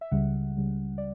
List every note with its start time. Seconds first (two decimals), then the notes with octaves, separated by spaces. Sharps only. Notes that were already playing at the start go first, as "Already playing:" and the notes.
0.01 E5
0.11 C#2 C#3 G3 F#5
0.57 C#2 C#3 G3
0.98 D5